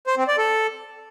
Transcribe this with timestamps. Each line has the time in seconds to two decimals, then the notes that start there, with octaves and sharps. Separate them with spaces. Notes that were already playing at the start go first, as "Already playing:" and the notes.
0.07 C5
0.17 C4
0.28 D5
0.38 A4